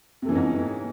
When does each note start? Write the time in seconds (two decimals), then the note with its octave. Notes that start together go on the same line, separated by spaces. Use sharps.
0.22 C3
0.26 A3
0.29 E3
0.32 C#4
0.35 G#2